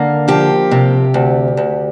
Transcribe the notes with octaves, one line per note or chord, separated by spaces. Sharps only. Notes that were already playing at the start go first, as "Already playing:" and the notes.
Already playing: D3 A#3
F3 G4
C3
D2
D2